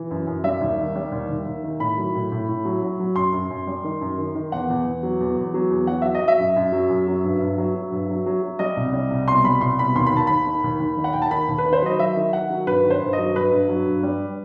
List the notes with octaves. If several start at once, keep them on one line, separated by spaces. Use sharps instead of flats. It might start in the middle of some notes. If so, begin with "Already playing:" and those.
Already playing: E3
F#2
F#2
G3 E5
D#2
D#3
G3
D#2
D#2
D#2
D#3
A2 B5
F#3
A2
A2
A2
F#3
F#3
F#3
F#2 C6
F#2
F#2
G3
D#3
F#2
D#3
D#3
E2 F#5
E2
E2
F#3
E2
E2
F#3
E2
F#3 F#5
F#3 E5
D#5
F#3
E5
F#2
F#2
F#3
F#2
F#3
G2
G2
F#3
F#3
G2
F#3
F#3
F#3
G3 D#5
C2
G3
C2
B2 C6
G3 B5
C2 C6
B2 B5
D#2 C6
B5
D#2 A5
D#2 B5
D#3
D#2
D#2
D#3
F#5
D#2 G5
A5
D#3 B5
D#2
B4
D#3
C5
F#3 D#5
F#3 E5
D#3
D#3 F#5
F#3
G2 B4
D#3
C5
G2
D#5
F#3
G2 B4
G2
F#3
G2
G3